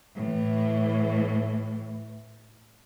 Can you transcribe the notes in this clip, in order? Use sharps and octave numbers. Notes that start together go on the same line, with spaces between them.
A2 E3